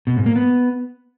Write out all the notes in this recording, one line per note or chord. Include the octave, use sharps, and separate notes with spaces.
B2
G#2
A#3
B3